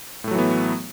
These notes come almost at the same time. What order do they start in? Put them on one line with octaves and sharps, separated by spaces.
A2 A3 F#3 E3 B3